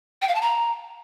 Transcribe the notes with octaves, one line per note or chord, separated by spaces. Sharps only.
G5
F5
A5
A#5